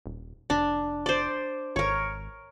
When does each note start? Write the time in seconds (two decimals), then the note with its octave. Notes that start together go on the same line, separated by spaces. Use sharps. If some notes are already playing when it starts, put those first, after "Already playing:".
0.06 D#1
0.50 F1 D4
1.06 C5 D5
1.76 G#1 A#4 C#5